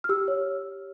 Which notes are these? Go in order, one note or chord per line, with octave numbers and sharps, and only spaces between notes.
F6
G4 E6
C#5